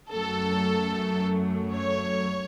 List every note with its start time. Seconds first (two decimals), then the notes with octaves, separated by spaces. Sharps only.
0.11 F#2 F#3 A3 A4
1.74 C#5